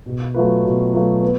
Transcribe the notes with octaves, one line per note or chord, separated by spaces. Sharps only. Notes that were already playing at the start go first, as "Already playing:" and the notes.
B2
F#3 A3 F4 B4
B2
F#3 A3 F4 B4
B3